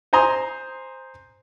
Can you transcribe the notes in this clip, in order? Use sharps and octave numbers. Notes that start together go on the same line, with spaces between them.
C5 G#5 A#5 C6 D#6